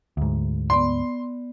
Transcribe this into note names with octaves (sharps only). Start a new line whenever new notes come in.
D2 G#2
B3 D5 C6